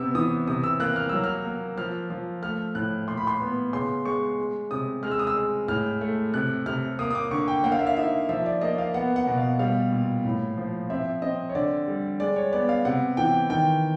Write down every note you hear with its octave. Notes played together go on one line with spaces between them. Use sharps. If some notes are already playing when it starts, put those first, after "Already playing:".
Already playing: C3 B3 E6
E3 D#6
C3 D#6
E6
A#3 F#6
F6
F#3 E6
F6
A#3
F3 F6
F3
A3 F6
A2 F#6
A#2 C6
B5
C6
B3
C#3 C6
G#3 C#6
G#3
C3 D#6
G#3 F6
E6
D#6
E6
G#3
A2 F6
A3
C3 F#6
C3 F6
A#3 D#6
D#6
D6
D3 C#6
G5
A#3 F#5
F5
E5
F5
D#4 E5
F3 E5
D5
A#3 D#5
F5
B3 F#5
F#5
B2
F5
G3 F5
A#2
A2
F3
C4 E5
C4 D#5
C#5
D3 D5
G3
G#3 D5
C#5
B3 D5
F5
C3 F#5
E3 G5
D#3 G5